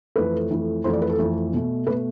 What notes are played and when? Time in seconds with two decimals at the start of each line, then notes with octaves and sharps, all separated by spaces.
0.16 F2 E3 A3 B4
0.50 F2 E3 A3
0.84 F2 E3 A3 C5
0.93 D5
1.02 B4
1.10 A4
1.19 F2 E3 A3
1.53 B2 A3
1.87 B2 A3 B4